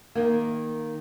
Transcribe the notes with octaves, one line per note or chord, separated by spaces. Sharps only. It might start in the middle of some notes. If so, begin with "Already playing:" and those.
D#3 A#3